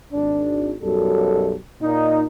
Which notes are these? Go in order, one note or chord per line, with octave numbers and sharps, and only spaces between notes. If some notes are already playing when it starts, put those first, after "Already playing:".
G#1 D4
B1 F#2 G3 A4
A#2 D#4